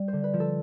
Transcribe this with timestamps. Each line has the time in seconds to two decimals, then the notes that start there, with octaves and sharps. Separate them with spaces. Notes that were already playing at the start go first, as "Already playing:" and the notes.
Already playing: G3
0.08 D3 C5
0.24 B4
0.33 F3
0.40 A4